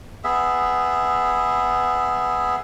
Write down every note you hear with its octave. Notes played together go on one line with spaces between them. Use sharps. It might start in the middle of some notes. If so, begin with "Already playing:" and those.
B3 G#4 E5